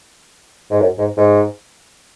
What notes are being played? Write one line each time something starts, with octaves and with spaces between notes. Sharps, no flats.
G#2
F#2
G#2
G#2